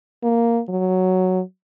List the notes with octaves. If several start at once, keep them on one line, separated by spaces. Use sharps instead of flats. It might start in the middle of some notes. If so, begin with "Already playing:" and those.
A#3
F#3